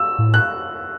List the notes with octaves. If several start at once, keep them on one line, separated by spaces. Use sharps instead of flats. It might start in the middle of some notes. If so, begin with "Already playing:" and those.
Already playing: E6
A2
F#6